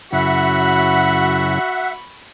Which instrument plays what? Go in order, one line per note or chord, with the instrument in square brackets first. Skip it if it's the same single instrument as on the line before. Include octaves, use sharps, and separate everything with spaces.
[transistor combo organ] F#2 C#3 E4 [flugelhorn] F#4 [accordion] E5 F#5 [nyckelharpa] B5 C#6